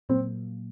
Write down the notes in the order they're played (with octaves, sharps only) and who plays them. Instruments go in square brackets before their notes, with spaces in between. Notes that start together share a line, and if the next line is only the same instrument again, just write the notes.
[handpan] A#2 F#3 A#3 [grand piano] C4